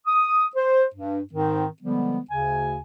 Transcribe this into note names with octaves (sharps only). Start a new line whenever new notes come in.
D#6
C5
G2
G#2 D#3 C4
D3 F3 G3 G#3 B3
D2 C#3 G#5